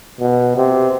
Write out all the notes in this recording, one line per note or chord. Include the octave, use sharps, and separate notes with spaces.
B2
C3